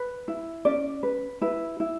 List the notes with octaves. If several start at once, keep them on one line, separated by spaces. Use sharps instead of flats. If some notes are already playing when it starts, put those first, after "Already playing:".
Already playing: B4
E4
C#4 D5
B4
E4 B4
E4